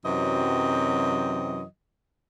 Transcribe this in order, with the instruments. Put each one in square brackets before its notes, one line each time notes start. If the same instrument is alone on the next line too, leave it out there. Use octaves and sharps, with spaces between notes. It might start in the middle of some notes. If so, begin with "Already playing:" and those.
[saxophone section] F#2 C3 E3 F#3 C4 D#5